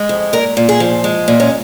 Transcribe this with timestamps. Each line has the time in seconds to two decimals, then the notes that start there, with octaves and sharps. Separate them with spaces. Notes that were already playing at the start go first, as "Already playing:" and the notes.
Already playing: G#3
0.09 F2
0.33 A#2 A#4
0.57 A#2
0.69 G#4
0.80 F3
1.04 G#3
1.28 A#2
1.40 C#4